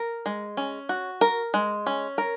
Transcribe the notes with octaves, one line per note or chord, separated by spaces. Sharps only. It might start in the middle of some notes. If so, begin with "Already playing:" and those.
Already playing: A#4
G#3
C#4
F#4
A#4
G#3
C#4
A#4